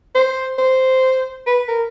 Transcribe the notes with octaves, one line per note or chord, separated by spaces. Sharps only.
C5
C5
B4
A#4